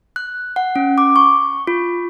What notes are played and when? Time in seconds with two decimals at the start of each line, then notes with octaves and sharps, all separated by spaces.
0.16 F#6
0.56 F#5
0.76 C#4
0.98 D6
1.16 C#6
1.67 F4